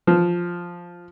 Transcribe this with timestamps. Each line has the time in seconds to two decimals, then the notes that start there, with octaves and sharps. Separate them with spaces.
0.07 F3